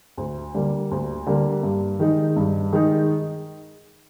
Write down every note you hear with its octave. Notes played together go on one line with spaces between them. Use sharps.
D2
D3 G3 A#3
D2
D3 G3 A#3
G2
D#3 G#3 D#4
G2
D#3 G#3 D#4